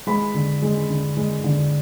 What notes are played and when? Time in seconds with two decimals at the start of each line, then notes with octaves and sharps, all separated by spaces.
0.07 G#3 B5
0.34 D3
0.62 G#3
0.89 D3
1.17 G#3
1.44 D3